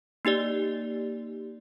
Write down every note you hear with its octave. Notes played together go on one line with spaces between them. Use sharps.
A#3 D#4 G4 D5